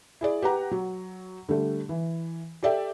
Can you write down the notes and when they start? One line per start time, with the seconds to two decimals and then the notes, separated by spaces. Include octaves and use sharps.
0.21 E4 G#4 D5
0.42 G4 B4 F#5 A#5
0.72 F#3
1.49 D3 G3 A3
1.89 E3
2.63 G4 A4 D5 E5 G5